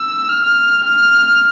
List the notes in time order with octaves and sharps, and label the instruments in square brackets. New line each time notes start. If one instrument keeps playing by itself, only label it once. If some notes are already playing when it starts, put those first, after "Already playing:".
Already playing: [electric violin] E6
F6
F6